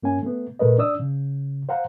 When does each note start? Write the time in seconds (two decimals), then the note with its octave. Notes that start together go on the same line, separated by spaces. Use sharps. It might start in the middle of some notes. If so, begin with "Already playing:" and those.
0.03 G2 A#3 C#4 G#5
0.22 A3 B3
0.59 A#2 A3 A#4 B4 D#5
0.78 D4 D5 D#6 E6
1.00 C#3
1.69 C5 F5 F#5 A#5